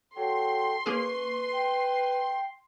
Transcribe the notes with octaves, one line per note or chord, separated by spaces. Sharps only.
F#3 A4 G5 C6
A#3 C#4 G#4 B4 C#6
G5